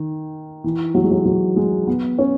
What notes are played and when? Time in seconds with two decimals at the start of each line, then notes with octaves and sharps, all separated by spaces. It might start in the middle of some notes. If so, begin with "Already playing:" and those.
Already playing: D#3
0.64 E3
0.95 F#3
1.03 G#3
1.11 F#3
1.25 F#3
1.56 G#3
1.87 B3
2.19 C#4